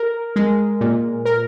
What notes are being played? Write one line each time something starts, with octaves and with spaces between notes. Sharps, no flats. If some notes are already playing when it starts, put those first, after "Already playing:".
Already playing: A#4
G#3
A#2
A#4